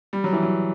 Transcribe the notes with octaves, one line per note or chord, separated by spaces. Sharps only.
G3
F#3
E3
F#3